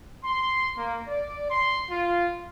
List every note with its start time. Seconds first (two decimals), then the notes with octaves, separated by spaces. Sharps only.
0.23 C6
0.77 A#3
1.07 D5
1.50 C6
1.89 F4